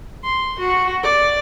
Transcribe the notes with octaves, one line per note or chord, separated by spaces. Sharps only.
C6
F#4
D5